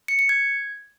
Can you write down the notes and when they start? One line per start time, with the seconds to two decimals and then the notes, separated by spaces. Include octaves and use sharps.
0.08 C#7
0.19 C#7
0.29 G#6